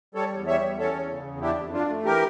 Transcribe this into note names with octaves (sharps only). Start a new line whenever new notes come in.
G3 A4 C#5
E2
G3 C#5 E5
E2
C#4 A4 C#5
E2
C#3
E2
D4 E4 G4
F2
D4 F4
A3
E3 G4 A#4